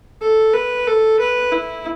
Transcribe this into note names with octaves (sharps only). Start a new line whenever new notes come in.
A4
B4
A4
B4
E4